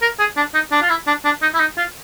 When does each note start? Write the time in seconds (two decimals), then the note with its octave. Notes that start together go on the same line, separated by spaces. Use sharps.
0.02 A#4
0.19 G#4
0.37 D4
0.54 D#4
0.72 D4
0.82 F4
0.90 E4
1.07 D4
1.25 D4
1.42 D#4
1.54 E4
1.60 D#4
1.78 F4